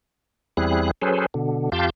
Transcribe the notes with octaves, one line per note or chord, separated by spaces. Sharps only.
E2 G3 C4 E4 G#4 F#6
F#3 C#4 G#4 A4 B4 C5
B2 D3
F2 F4 G4 F5 A5 G6